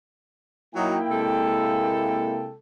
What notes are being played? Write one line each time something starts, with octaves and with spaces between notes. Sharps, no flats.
F#3 A#3 D#4 E4 G5
C3 G#3 A4